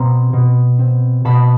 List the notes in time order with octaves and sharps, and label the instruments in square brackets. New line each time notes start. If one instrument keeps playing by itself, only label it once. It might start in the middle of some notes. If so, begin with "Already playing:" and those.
Already playing: [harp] B2 C4 A#5 C6
B2
C4
B2 A5 B5